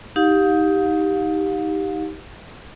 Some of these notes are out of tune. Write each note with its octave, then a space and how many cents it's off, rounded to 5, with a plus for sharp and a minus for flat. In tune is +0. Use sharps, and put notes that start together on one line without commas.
D#4 +20 G4 +0 F5 +40